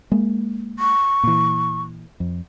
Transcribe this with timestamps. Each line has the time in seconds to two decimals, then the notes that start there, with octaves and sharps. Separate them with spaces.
0.12 G#3 A#3
0.79 C#6
1.23 A#2 E3
2.20 F2